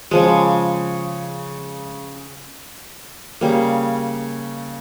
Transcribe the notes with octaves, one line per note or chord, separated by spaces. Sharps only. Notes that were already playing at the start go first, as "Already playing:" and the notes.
C#3 F3 G#3
C#3 G3 A#3